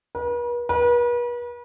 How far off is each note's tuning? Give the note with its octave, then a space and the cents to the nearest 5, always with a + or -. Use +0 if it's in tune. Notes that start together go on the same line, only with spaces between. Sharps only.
B4 -45
B4 -40